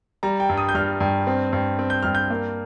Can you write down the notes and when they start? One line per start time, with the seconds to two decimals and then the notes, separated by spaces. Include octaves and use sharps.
0.23 G3 A#5
0.40 G5
0.49 G2
0.57 D#6
0.69 G6
0.75 G2 F6
1.00 G2
1.27 C4
1.53 G2
1.79 C4
1.90 G6
2.03 G2 F6
2.15 G6
2.30 A#3